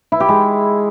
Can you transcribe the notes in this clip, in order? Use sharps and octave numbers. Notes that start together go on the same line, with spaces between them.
E4
G4
G#3